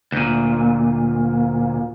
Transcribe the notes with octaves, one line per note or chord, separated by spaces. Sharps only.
D2 A#2